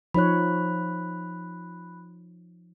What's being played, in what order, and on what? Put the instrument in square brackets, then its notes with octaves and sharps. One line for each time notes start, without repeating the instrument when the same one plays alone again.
[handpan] F3 D#4 C#5 [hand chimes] B5 F#6